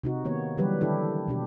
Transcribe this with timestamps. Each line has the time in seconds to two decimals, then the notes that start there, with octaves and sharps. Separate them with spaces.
0.04 C3 D#4 F#4
0.25 D#3 A#3 B3 C#5
0.57 D3 E3 F#3 G3 G4 B4
0.81 D3 D#3 D4 E4 G4 A4
1.28 B2 D4 G4